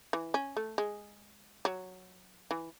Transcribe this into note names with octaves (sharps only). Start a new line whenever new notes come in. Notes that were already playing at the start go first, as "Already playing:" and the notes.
E3
C#4
A3
G#3
F#3
E3